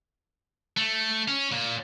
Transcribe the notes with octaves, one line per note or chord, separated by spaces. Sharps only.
A3
C#4
A#2